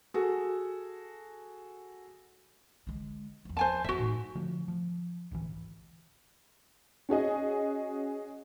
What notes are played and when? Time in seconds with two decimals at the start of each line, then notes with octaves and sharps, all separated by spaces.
0.14 F#4 G#4 A4
2.87 D3 G#3
3.45 E2 F3
3.57 C5 G#5 A5
3.84 F#1 F2 F#4 E5
3.99 A2 D#4
4.35 D3 F3 A3
4.68 F3
5.31 D1 G#1 D2 E3
7.09 C#4 F#4 G#4 D#5